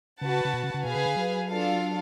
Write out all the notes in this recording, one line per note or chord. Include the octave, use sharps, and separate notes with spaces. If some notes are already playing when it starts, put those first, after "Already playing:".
C#3 F#4 B4 F#5 A5
C#3
B2
C#3
C#3
B2 G#4 B4 F5 G#5
C#3
D3
F#3
D4 F4 A4 F5